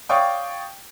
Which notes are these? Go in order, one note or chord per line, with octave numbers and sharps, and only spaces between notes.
C#5 D5 F5 G5 C#6 D#6